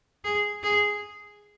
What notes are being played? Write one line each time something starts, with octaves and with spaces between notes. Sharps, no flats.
G#4
G#4